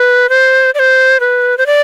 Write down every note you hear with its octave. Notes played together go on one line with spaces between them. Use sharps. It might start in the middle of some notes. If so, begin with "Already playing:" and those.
Already playing: B4
C5
D5
C5
B4
C5
D5